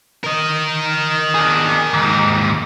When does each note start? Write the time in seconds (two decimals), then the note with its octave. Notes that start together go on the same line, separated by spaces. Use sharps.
0.24 A#4 D#5
1.34 D4 G#4
1.93 D#2 G#2